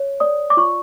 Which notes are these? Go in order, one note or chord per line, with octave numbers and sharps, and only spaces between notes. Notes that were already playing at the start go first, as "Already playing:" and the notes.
Already playing: C#5
D5 D#6
D6
F4 C#6